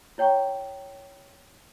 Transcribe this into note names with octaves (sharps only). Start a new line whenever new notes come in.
E4 C#5 G5 A#5 C#6